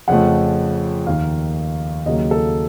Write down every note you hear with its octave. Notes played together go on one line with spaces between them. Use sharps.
F2 C#3 F3 A3 F#5
D#2 D#3 A#3 F5
D#2 C#3 F#3 A#3 D#5
A4